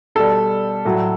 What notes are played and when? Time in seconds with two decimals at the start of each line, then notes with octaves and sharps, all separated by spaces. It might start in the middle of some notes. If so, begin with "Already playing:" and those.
0.15 B2 G3 A4
0.85 A2 F#3